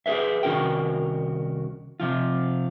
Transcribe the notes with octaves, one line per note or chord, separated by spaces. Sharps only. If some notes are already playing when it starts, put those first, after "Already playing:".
G4 G#4 A#4 B4 E5
C2 D#3 C#4 F#4 A#4 G5
C3 F3 F4